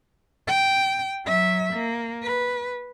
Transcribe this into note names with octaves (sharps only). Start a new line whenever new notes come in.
G5
F#3 E5
A#3
B4